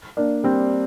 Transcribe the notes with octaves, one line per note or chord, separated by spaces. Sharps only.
A#3 D4
G3 C4